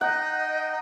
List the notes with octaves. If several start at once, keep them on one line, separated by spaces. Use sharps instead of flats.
D#4 D#5 F#5 G5